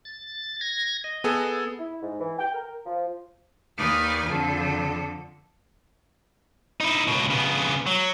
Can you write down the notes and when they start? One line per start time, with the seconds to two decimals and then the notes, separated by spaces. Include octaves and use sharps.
0.05 A6
0.61 G#6 A#6
1.04 D#5
1.24 B3 G#4 A4
1.79 E4
2.02 G#2
2.20 E3
2.38 G5
2.54 A#4
2.86 F3
3.78 D#2 D#4 B4 D5 G#5 F6
4.27 F2 D3 A4
6.80 D#4 E4
7.08 C#2 B2
7.31 C#3 B3
7.87 F#3